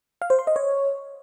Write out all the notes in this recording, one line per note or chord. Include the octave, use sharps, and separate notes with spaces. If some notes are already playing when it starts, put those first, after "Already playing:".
F5
C5
C6
D#5
C#5